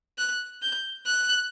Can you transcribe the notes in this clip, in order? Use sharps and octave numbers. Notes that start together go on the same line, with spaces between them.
F#6
G6
F#6